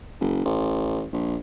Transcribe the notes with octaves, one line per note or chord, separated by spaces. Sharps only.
F#1
A1
A#1